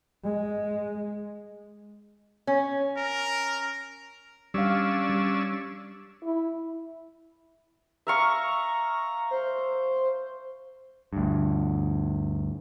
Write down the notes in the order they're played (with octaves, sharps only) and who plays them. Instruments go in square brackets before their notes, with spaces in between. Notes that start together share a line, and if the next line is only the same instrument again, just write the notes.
[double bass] G#3
[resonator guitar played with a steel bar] C#4
[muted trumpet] A#4
[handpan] G3 F5 [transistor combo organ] C#4 D4 E6
[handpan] G3
[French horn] E4
[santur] E5 F5 C#6 [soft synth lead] A#5
[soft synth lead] C5
[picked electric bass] D2 G2